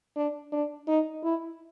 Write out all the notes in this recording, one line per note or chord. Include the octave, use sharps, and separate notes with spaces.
D4
D4
D#4
E4